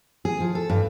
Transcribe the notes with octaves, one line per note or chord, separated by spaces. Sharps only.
G#4
F3
A4
G2